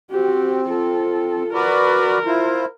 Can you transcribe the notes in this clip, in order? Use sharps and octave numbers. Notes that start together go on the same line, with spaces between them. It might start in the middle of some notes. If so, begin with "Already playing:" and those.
C4 F#4 G4
F4 A4
F#4 A#4 B4 D5
E4 F4 C5